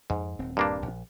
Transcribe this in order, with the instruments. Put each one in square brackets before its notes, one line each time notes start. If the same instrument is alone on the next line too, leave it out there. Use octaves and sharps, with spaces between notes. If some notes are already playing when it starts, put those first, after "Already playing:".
[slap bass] F2 [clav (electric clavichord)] G#2
[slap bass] D#1 C4
[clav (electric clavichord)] G2 A#3 D4
[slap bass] A#1